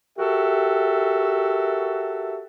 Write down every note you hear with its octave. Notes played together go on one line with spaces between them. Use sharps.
F#4 G4 A4 A#4 E5